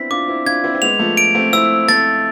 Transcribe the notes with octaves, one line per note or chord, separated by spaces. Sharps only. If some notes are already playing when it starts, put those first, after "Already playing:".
Already playing: B3 C4 D4 E4 B6
D4 F4 D6
C4 E4
D4 F4 G#6
C4 E4
C4
G#3 B3 F7
F3 A3
D7
A3 C4
C4 E4 E6
A3 C4 A6